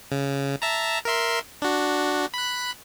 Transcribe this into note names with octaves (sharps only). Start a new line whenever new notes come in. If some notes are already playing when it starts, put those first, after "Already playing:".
C#3
E5 A5 A#5
A#4 E5 C6
D4 F#4
B5 F#6